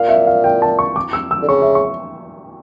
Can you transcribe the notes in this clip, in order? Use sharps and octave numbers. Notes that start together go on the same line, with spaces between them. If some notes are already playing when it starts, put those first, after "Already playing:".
Already playing: A#2 F5
E5
F5
G5
A5
C#6
D6
E6
E6
D3
C#3 C#6
E5
C#6